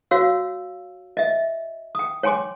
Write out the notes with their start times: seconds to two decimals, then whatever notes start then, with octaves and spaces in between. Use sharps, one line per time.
0.11 F#4 C#5 F5 E6
1.17 D#5 E5
1.95 G5 D#6
2.23 C#5 G5 G#5 C6 D6